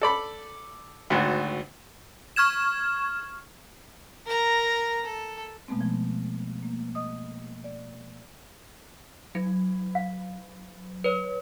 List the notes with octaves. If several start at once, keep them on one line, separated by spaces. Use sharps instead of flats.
A4 D5 B5
G#1 D2
C#6 F6 G#6 E7
A#4 A#5
A4
B2 G#3 A3 B3 C4
F3
A#3
D#5 D#6
D5
F#3
F5
B4 C#5